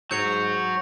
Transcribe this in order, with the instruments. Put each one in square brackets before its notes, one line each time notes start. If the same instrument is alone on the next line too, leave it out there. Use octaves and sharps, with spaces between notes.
[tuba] G#2 [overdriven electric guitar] F#3 F#4 [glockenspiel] G6 C#7 F7